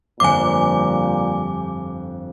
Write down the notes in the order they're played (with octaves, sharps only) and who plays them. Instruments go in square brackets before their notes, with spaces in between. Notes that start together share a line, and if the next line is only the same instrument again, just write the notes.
[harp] G1 F2 [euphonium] A#2 [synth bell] G#5 D6